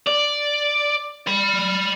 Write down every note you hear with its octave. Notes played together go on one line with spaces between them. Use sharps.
D5
D5 B5